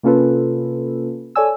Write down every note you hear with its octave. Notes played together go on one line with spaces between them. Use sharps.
C3 A#3 C#4 F4 A4 B4
A4 C#5 D5 G#5 E6